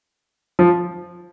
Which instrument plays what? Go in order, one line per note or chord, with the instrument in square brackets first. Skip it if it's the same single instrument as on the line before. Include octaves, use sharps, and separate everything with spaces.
[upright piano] F3